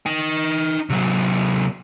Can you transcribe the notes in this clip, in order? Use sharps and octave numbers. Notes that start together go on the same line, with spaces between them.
D#4 G5
C3 F#3